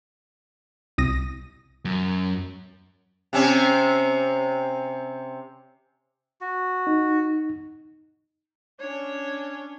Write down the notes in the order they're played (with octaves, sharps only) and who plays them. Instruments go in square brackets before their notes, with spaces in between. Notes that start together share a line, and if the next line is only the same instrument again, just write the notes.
[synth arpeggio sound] C2 D#6 A#6
[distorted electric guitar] F#2
[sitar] C3 C4 C#4
[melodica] F#4
[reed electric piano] D#4
[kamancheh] C#4 D4 [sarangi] C#5